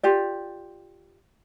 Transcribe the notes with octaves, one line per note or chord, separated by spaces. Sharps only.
F4 G4 D5